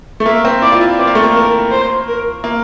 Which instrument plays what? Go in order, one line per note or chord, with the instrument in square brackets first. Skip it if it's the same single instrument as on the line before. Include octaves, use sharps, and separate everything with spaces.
[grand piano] A3
[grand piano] A#3 [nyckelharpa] E5
[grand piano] C4
[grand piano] E4 [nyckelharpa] D5
[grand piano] F4
E4
[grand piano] C4 [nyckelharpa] D5
[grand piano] A#3
A3
A#3
[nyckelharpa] A#4
C5
A#4
[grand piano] A#3